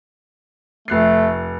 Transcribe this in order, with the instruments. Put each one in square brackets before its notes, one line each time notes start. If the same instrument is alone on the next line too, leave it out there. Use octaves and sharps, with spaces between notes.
[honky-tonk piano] F1 F#6 C7 [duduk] A3